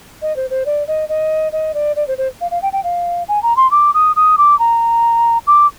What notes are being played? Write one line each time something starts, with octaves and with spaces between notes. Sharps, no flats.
D#5
C5
C5
D5
D#5
D#5
D#5
D5
D5
C5
C5
F5
F5
G5
G5
F5
G#5
A#5
C6
D6
D#6
D#6
D6
A#5
D6